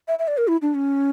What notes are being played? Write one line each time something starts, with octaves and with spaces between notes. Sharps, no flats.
E5
E5
D5
A#4
E4
D4
C#4